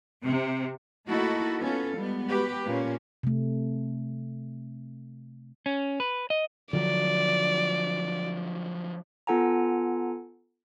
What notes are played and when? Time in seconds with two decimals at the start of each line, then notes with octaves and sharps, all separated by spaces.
0.24 C3
1.08 A3 A#3 D#4 E4 F#4 A4
1.60 B3 C#4 F4 A4
1.96 G3 G#3 B3
2.29 F#4 G4 B4
2.66 A#2 A#3 C#4
3.23 C3 A3
5.66 C#4
6.00 B4
6.30 D#5
6.73 D3 F3 F#3 D5
9.27 B3 F4 A4 F#5 G#5 A#5